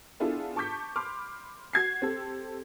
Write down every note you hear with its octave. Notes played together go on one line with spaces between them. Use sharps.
B3 D4 E4 F4 G#4 A4
A5 C#6 D6 G6 B6
B5 C6 D6 F6
F#4 G#6 C7
C4 G4 A4